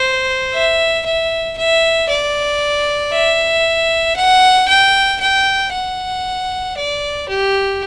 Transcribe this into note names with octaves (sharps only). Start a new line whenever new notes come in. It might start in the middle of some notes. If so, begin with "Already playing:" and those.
Already playing: C5
E5
E5
E5
D5
E5
F#5
G5
G5
F#5
D5
G4